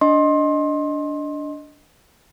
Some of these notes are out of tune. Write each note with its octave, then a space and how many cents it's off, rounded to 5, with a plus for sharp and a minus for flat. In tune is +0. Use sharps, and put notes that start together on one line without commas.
D4 -10 D#5 +0 C6 +25